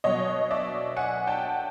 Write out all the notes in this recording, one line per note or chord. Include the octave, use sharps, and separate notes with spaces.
B2 F#3 C#5 D#5
D5 E5
F#5 G#5
G5 A5